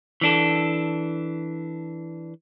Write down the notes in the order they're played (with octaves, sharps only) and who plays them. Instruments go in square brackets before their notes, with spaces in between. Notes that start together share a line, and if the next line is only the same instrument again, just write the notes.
[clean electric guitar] E3 D4 A4